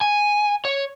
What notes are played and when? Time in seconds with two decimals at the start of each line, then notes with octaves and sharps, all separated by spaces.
0.01 G#5
0.65 C#5